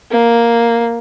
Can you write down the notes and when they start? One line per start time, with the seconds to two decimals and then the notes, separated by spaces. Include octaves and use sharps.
0.11 A#3